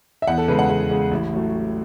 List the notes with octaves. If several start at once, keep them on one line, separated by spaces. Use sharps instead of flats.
E5
E2 F#5
A4
C#3 G#3 B4
F#5
E2 G#4
C#3 G#3
A1 E4
A2 F#3 A3